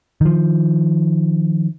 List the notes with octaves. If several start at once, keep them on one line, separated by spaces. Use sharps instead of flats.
D#3 F3